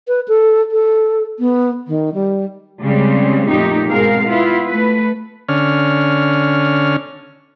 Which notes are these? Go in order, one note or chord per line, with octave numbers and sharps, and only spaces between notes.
B4
A4
A4
B3
D#3
G3
C#3 G3 G#3 C4
F2 A#2 A3 D#4 G4
G#2 B2 C4 G#4 A#4 F5
B3 E4 F4
A3 B4
D3 C#4 F6